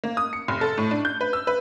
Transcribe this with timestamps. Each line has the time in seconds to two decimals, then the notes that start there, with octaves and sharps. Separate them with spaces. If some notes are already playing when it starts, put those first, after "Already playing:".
0.04 A#3
0.17 D#6
0.33 C#7
0.48 F1
0.61 A4
0.78 A2
0.91 D4
1.05 G6
1.21 B4
1.33 E6
1.47 B4